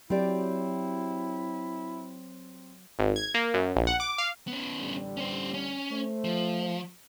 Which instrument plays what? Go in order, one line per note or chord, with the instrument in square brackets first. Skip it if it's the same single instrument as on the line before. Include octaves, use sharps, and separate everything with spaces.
[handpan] F#3 [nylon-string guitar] C4 G4 D5 [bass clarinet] E4
[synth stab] G#1
G#6
A#3
F#2
A#1
F#5
D6
F5
[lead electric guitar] B3 C#4
[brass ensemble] A1 D3 G3
[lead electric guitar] C#4 C5
C#4
[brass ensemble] A3 C5
[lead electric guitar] F3